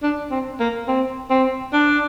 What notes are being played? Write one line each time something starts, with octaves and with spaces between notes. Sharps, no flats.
D4
C4
A#3
C4
C4
D4